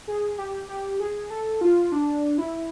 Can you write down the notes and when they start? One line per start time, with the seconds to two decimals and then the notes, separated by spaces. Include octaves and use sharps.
0.08 G#4
0.38 G4
0.69 G4
1.00 G#4
1.30 A4
1.61 F4
1.92 D4
2.38 E4